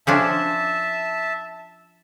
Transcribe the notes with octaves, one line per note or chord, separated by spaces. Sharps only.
F3 C#4 D4 E5 A5